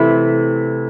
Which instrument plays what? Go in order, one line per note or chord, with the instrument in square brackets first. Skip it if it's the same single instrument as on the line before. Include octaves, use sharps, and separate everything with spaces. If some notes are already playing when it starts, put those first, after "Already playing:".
Already playing: [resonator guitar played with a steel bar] C3 E3 A3 E4